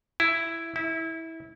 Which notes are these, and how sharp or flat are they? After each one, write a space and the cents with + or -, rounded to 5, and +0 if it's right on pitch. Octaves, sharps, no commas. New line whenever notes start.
E4 +5
E4 -20